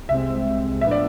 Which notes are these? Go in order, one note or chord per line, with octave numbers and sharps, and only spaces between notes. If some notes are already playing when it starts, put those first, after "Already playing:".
C2 C3 G#3 C4 E5
A2 F3 B3 D4 E5
D5